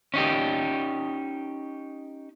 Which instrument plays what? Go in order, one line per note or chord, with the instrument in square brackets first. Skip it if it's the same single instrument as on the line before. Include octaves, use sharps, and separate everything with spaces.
[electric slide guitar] C#4 D#4 G4